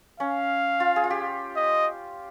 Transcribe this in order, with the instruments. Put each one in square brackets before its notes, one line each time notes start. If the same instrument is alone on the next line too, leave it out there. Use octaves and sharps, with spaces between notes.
[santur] C#4 [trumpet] F5
[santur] F4
G#4
F4
G4
[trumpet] D#5